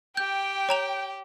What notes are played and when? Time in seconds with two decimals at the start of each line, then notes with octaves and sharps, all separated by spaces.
0.17 G4 G5 G6
0.69 C#5 A#5 F7